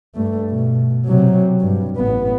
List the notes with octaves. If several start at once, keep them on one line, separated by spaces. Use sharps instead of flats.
G2 A3
B2
C3 F#3
G2
A1 B3